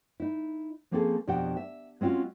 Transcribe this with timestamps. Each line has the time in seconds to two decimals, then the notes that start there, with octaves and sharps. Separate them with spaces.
0.20 D#4 E4
0.91 F3 A#3 C4 C#4 G#4 A4
1.28 F2 B2 D4 G4 F#5 G5
1.57 E5
2.01 G#3 C4 C#4 F4 F#4